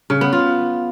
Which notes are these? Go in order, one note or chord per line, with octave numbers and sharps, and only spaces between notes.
C#3
B3
F4